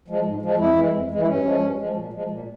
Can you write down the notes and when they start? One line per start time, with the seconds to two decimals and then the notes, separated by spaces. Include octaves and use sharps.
0.08 F3 G#3
0.25 G#2
0.42 F3 G#3
0.59 F2 E4
0.76 E3 G#3
0.93 F2
1.11 E3 G#3
1.22 E4
1.27 G2 C#4
1.45 F3 G#3
1.61 G2
1.79 F3 G#3
1.96 A#2
2.13 F3 G#3
2.31 A#2